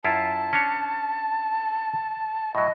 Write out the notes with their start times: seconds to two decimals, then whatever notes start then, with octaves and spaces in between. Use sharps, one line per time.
0.04 F#2 E4 F4 A5
0.53 C#4 D4 C#5
2.55 A2 F#3 D#5